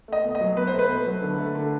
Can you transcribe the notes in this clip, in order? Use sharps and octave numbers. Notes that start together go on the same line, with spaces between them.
A3 D#5
B2
D#5
F#3
B2 B4
C5
A3
B4
B2
F#3
D3
A3
D3